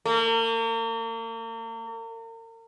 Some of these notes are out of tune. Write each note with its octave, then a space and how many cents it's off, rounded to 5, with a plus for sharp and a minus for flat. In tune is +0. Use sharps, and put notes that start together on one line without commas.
A#3 -40